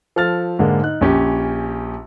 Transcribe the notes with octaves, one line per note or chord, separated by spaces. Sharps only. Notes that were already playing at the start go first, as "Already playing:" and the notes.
F3 A4 F6 A6
G#2 D3 G#3 A#3
D#4 F#6
A#1 C#4 G4